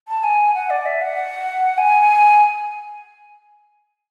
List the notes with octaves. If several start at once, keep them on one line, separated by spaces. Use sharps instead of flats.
A5
G#5
F#5
D5
E5
F#5
G#5